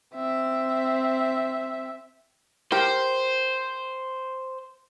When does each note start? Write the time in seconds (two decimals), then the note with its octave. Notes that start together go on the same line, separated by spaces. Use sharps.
0.15 C4 E5
2.72 G4 A#4 C5